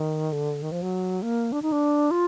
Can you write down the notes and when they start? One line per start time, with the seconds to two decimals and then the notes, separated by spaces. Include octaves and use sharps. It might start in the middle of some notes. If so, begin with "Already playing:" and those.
Already playing: D#3
0.32 D3
0.62 D#3
0.72 F3
0.82 F#3
1.22 A#3
1.52 D4
1.62 D#4
1.72 D4
2.11 F4